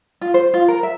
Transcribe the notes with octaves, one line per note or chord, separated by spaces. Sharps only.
F4
C5
F4
A#4
E5